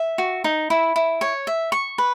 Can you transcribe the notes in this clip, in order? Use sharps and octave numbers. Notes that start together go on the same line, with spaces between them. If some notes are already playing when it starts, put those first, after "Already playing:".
Already playing: E5
F#4
D#4
E4
E4
C#5
E5
C#6
B4